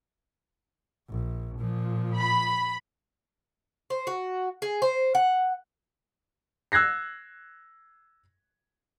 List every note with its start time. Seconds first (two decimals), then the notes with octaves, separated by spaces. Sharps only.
1.09 A#1
1.58 A#2 F3
2.15 B5
3.90 C5
4.07 F#4
4.62 G#4
4.82 C5
5.15 F#5
6.72 E6 F#6 G#6 A#6 C7